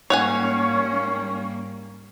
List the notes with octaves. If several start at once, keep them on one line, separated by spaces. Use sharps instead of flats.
G#2 G3 A#3 C#4 C#5 F#5 G#5